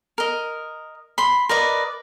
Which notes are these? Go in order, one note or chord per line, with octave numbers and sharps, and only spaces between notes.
A#4 D#5
B5 C6
A#4 B4 D5 D#5